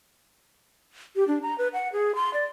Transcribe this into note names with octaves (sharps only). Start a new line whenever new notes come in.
G4
D4
A#5
B4
F#5
G#4
C6
D5